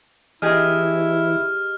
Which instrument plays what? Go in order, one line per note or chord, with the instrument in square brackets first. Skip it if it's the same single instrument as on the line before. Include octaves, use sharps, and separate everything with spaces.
[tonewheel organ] E3 [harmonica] E4 [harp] G4 G#4 D#5 [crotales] C#6 F6